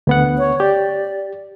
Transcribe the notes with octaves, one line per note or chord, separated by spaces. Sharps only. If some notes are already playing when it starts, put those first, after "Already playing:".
D2 B3 F#5
C#5
G4 D5